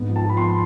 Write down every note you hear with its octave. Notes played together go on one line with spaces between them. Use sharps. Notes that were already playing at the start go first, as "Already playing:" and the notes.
Already playing: G#2 B3
F3
A5
F3 B5
C6